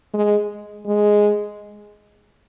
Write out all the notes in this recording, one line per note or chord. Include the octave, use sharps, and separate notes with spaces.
G#3
G#3